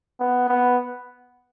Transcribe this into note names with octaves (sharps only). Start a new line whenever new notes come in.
B3
B3